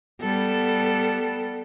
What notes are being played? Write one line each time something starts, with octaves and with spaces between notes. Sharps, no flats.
G3 B3 A4